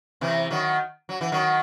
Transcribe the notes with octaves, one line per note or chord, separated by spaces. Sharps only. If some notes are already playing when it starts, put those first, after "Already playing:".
C3 E3
D#3 F#3
F#3
E3
D#3 F#3